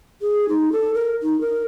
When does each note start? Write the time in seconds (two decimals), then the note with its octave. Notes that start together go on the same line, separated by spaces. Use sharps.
0.22 G#4
0.49 D#4
0.72 A4
0.94 A#4
1.23 D#4
1.41 A#4